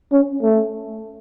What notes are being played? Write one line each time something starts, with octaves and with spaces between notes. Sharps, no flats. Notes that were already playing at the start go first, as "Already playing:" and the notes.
C#4
A3